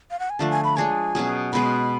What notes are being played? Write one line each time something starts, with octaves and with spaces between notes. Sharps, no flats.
F5
F#5
G#5
D3 F3 A3 D4 A5
G#5
B5
G#3 D4 G#4 C#5 G#5
B2 F#3 C#4 G#4
B2 G#3 B3 B5